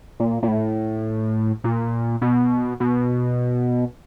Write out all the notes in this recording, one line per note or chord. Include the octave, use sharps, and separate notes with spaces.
A#2
A#2
A2
A#2
B2
B2